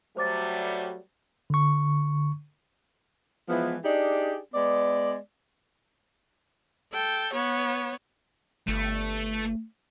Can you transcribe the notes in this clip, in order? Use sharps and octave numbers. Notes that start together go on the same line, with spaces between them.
F#3 G3 A3 C5 D6 A6
D3 C#6
E3 F3 G#3 B3 E4
D4 D#4 G4 G#4 D5
G#3 B3 D5
A4 G5
B3 C#5
G1 A3